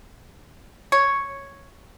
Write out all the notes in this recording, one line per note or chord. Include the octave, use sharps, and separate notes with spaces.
C#5